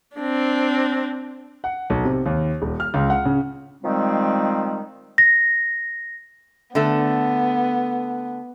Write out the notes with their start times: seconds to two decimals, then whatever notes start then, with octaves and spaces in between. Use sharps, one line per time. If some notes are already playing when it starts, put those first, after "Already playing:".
0.16 C4 D4
1.64 F#5
1.90 B1
2.04 C3
2.26 D#2
2.62 D#1
2.80 F6
2.94 C#2
3.10 F#5
3.25 C#3
3.83 D#3 F3 G3 G#3 C4
5.18 A#6
6.75 D3 A3 B3